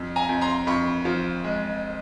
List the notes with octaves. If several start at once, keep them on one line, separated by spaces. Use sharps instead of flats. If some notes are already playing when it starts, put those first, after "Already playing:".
Already playing: F2
G#5 A#5
F2
A#5 C6
F2 B5 C#6
F3
G#3